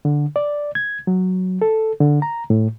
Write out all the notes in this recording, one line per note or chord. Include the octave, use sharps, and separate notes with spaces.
D3
D5
G#6
F#3
A4
D3
A#5
A2